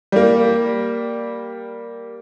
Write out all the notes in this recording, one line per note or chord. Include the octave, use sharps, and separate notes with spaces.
G3 A#3